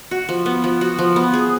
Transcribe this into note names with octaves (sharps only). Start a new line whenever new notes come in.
F#4
F3
B3
F3
F#4
F3
B3
G#4